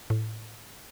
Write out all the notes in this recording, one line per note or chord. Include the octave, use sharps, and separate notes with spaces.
A2